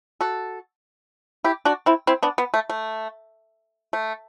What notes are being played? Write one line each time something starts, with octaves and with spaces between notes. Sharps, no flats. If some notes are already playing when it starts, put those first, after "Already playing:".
F#4 A4
E4 G4
D4 F#4
C4 E4
C4 E4
B3 D4
B3
A3
A3
A3